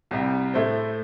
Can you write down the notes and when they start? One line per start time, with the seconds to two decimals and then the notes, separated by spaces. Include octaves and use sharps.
0.11 C2 C3 G3
0.54 A2 A3 E4 C5